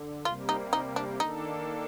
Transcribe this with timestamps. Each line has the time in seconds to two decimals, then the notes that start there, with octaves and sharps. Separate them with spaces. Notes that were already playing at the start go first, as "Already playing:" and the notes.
Already playing: D3
0.25 C3 G3 A#3 F4
0.49 D#4
0.73 D#4
0.96 D4
1.20 D#3 A#3 D4 D#4 A4